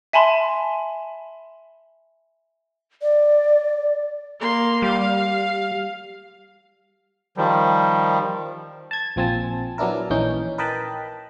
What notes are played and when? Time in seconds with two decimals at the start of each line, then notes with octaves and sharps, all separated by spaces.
0.13 E5 G#5 A5 B5 C6
3.02 D5
4.39 A#3 C6
4.82 G3 F5
7.37 D#3 F3 G3
8.91 A5 G#6
9.16 A#1 F3 C4 G#5 A5
9.78 F#3 B3 D4 E4 A#4
10.10 A#1 E3 C#4 D#4 G6
10.58 A#4 B4 D#5 G5 A5 B5